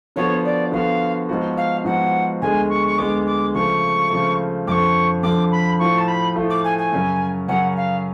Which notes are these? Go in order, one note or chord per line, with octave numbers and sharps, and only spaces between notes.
D3 F3 B3 F#4 C#5
D5
D3 F3 B3 F#4 F5
G#2 F3 B3 F#4
F5
G#2 F3 B3 F#4 F#5
D2 D3 G#3 B3 G#5
C#6
C#6
D2 D3 G#3 B3 D6
D6
C#3 F3 A3 C#6
C#3 F3 A3
F2 D3 F3 C#6 D6
F2 D3 F3 D6
B5
A2 F3 A3 F4 C#6
A5
B5
A2 F3 A3 F4
D6
G#5
G#5
F#2 C#3 F#3 C#4
F#2 C#3 F#3 C#4 F#5
F5